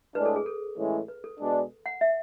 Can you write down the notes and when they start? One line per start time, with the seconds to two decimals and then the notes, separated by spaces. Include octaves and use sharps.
0.15 A2 G#3 D4 B4
0.26 A4
0.36 G#4
0.46 A4
0.77 A2 E3 G#3 C#4 E4
1.08 B4
1.24 A4
1.39 B2 G#3 D4
1.86 F#5
2.01 E5